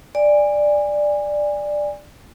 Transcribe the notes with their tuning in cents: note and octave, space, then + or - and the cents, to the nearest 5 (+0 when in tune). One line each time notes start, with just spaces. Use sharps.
D5 +5 G#5 -25